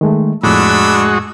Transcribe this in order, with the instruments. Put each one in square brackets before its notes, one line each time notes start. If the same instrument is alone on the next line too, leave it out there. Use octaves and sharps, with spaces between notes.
[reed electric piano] D#3 G#3 A3
[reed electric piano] F2 A2 [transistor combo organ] G#3 F#4 [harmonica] D4 B5 E6